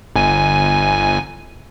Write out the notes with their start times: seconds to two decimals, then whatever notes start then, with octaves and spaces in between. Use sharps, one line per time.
0.16 G1 G#5